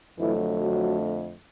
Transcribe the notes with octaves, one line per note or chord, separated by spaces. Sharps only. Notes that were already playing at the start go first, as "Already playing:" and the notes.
F2 D3 E3 F#3 A3 E4
F#3 F#4